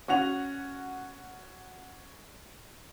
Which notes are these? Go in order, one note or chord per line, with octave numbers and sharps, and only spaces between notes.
C#4 F#4 F#5 F7